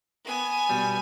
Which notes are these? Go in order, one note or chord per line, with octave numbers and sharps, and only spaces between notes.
B3 G#5
B2 G3